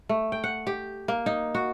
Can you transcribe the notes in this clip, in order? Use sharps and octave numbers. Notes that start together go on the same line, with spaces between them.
A3
G5
F#5
G4
A#3
D#4
F#4